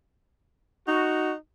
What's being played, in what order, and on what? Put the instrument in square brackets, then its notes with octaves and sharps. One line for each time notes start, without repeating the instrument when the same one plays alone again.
[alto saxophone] D#4 [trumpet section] F#4